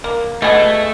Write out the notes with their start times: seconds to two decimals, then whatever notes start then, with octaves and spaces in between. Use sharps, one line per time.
0.04 A#3
0.42 B2 A3 G#4